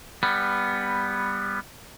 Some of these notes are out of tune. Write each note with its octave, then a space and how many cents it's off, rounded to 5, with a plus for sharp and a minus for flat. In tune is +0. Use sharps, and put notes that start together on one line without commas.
G3 +15 B3 +0